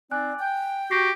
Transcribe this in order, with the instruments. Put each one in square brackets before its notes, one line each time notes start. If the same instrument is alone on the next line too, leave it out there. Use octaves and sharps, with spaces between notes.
[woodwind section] C4 D#4 D5 [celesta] G#5 F#6
[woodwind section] G5
[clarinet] F#4 [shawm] G4 [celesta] A#6 C7